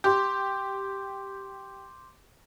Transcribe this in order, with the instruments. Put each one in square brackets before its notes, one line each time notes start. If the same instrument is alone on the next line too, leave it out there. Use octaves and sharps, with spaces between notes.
[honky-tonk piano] G4 [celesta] C6 D6 G6